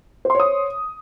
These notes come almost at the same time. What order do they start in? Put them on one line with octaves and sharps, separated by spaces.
C5 C6 C#5 D#6